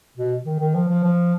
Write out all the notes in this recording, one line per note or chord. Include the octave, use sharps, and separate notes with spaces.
B2
D#3
D#3
F3
F3
F3